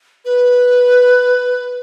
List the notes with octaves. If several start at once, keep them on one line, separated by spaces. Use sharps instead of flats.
B4